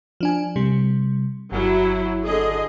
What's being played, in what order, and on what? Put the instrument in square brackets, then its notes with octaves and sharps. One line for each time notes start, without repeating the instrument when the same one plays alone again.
[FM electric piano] F3 D4 G#5
C3 G3
[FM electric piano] G1 [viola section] F#3 E4
[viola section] D3 G#4 D#5